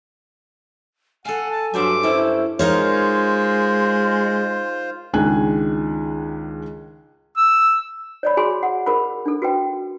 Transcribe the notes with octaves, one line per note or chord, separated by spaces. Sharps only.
A4 F5 F#5 G#5
A5
G2 F#3 C5 E5 D6
C#4 E4 A4 C5
G#3 D#4 F4 A#4 C5 C#5
C#2 D#3 D4 G#4 G#5 F#6
E6
C#5 D5 B5
F#4 G#4 G#5 B5 C6
F#5
G#4 A#4 B5
D4 A4
F#4 B4 G5